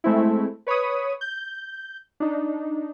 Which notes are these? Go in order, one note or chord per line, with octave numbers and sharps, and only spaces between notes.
G#3 A3 C4 E4
B4 C#5 B5 C#6 D#6
G6
D4 D#4